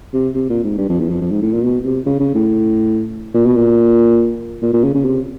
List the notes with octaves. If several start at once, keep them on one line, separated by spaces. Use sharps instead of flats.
C3
C3
A#2
G#2
G2
F2
E2
F2
F2
G#2
A2
A#2
B2
C3
C#3
C#3
A2
A#2
B2
A#2
A#2
A#2
C#3
C#3
C3